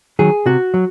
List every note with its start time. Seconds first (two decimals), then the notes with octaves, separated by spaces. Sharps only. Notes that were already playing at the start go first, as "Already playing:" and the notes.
0.19 D#3 F#3 G#4
0.46 C3 F#4
0.74 F#3